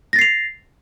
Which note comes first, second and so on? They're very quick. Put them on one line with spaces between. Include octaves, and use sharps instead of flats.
A#6 A6 C7 F7